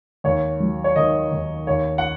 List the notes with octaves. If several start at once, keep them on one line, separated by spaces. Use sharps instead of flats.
D#2 C#5
F#3
C#5
D#3 D#5
D#2
D#2 C#5
F#5